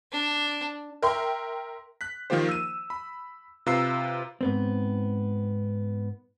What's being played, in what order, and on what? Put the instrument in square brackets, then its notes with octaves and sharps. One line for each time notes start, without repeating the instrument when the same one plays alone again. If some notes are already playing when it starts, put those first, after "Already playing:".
[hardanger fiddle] D4
[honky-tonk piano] A#4 E5 G5 C6
[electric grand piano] F#6 B6
D#3 F3 A#3 F4 G4 C5
E6 D#7
B5
C3 F4 B4 A#5 E6 C7
[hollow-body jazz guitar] G#2 B3 C4